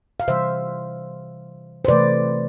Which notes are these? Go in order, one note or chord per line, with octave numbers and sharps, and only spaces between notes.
F5
C3 E3 G3 C5 E5
C5
C3 E3 A3 B4 D5